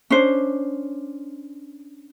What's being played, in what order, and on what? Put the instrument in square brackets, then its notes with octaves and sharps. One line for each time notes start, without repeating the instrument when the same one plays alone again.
[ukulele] C#4 D4 C5